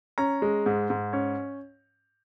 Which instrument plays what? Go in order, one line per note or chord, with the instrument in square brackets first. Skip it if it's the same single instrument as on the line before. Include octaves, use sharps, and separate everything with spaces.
[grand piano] C#4 A#5
G#3
G#2
G#2
C#4